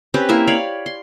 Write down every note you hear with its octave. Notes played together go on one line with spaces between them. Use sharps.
C4 C#4 G4 B4
A#3 E4 E5
C#5 D5 F5 B5
C6